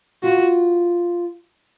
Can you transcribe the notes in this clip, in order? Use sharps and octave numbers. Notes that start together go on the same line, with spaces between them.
F4 F#4